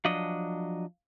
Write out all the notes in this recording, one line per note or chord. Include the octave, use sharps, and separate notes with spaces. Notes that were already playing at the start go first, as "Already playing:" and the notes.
F3 F#3 D4 D#5